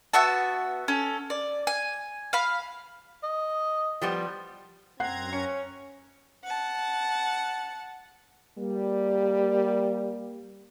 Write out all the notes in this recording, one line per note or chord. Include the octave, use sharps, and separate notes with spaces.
B3 F#4 E5 A5
C#4 A4
D5
G#5
F5 B5
D#5
F3 G3 B3
F#2 C4 F#5 A#5 F#6 G#6 C7
C#4 C#7
F#5 A5
G3 A#3